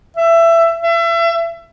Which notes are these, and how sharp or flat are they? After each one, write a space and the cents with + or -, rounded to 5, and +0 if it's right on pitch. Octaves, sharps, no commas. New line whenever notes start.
E5 +20
E5 +35